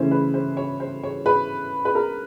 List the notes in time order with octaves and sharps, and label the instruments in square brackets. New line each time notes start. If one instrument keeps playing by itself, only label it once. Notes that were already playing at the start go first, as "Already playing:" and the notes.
Already playing: [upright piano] C#3 E3 A3 C#4 E4 C5
B4
C5
C#5
C5
C#5
B4
B4
A#4